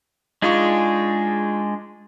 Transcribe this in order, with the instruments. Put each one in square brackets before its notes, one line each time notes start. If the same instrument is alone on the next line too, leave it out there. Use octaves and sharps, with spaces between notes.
[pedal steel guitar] G#3 D4 G#4 [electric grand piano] D#4 F4 C#6